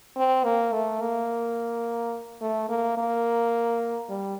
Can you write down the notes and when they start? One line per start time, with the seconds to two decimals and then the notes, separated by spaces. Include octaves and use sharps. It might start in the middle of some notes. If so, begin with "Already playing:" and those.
0.16 C4
0.44 A#3
0.73 A3
1.01 A#3
2.41 A3
2.69 A#3
2.97 A#3
4.09 G3